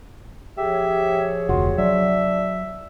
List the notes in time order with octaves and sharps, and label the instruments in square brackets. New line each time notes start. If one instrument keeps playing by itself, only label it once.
[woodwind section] F3 G#4 C#5 [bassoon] G4 [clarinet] E5
[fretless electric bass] F1 D2 [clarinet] F4 [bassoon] F#4
[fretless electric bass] F#3 [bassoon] D4 [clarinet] E5